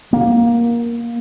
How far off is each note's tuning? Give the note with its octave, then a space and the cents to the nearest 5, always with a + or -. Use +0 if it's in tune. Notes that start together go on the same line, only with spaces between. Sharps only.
A#3 +15